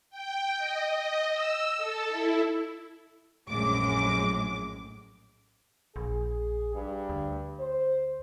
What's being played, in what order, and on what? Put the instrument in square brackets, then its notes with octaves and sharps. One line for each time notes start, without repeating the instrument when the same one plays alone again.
[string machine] G5
D#5
D#5
E6
A4
E4
[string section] A#1 F#2 A2 G#3 D6
[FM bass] A#1 [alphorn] G#4
[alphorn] G2
[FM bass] D2
[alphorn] C5